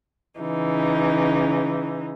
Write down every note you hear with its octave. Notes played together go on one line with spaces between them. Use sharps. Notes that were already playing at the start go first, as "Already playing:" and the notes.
C#3 E3 D#4